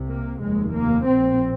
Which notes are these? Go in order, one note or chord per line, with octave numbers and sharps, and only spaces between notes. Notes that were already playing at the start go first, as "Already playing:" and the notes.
Already playing: C2 C3
A#3
F1 D#2 G#3
A#3
A#1 A#2 C4